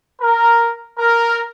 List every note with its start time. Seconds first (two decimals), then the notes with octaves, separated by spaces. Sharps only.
0.22 A#4
0.99 A#4